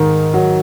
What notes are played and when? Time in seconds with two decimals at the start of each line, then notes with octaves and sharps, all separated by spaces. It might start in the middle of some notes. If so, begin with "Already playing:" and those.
Already playing: G#2 D#3
0.34 F#3